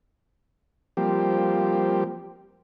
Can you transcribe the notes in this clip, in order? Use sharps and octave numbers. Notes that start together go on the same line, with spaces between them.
F3 G3 A#3 C4 G4